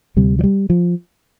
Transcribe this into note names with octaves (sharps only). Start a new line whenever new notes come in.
D2 C3 G3
F3
G3
F3